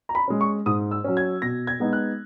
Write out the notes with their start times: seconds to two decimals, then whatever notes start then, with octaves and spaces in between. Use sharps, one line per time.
0.09 A#5
0.15 B5
0.28 G#3 C#4
0.41 C#6
0.66 G#2 D#6
0.91 E6
1.04 F#3 C#4
1.17 G#6
1.42 B2 A#6
1.67 G#6
1.80 G#3 B3 D#4
1.93 F#6